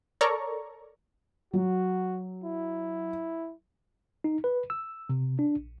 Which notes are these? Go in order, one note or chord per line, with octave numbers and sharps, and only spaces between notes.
A4 A#4 C#5 D5 A#5 C#6
F#3 F#4
E4
D#4
B4
E6
C3
D4
A#1